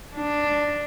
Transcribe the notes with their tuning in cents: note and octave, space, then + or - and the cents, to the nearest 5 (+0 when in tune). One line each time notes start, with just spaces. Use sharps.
D4 +5